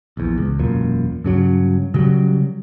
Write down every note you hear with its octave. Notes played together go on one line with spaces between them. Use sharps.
A#1 E2
C#2
E1 F#2 A#2
G2 C#3 F#3
C#3 F#3 G3